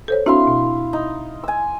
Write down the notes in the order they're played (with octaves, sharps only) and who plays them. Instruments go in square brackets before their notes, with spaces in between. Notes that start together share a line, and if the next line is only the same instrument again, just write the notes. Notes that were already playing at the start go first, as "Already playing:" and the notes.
[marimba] A4 C5 C#5
[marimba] C4 D4 F#4 [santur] E4 F5 C6
[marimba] B2
[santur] D#4
G#5 E6